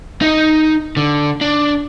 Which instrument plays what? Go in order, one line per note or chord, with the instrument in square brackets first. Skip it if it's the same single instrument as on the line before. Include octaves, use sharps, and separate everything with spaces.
[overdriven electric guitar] D#4 D#5
D3
D4